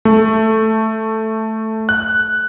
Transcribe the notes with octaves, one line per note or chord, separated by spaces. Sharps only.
A3
F#6